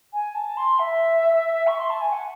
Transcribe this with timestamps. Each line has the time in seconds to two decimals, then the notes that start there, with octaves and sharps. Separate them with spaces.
0.13 G#5
0.35 A5
0.57 C6
0.79 E5
1.67 C#6
1.79 C6
1.90 A5
2.01 G#5
2.12 F#5